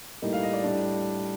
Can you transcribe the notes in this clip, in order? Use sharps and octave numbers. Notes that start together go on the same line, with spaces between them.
A2 G3 A#3 D#4
F5
D#5
D5
A2 G3 D4